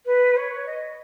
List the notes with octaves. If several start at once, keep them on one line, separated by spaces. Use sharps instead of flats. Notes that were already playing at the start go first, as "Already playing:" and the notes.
B4
C#5
D#5